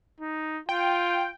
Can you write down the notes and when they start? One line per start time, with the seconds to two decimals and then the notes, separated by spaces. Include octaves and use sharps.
0.21 D#4
0.69 F4 G5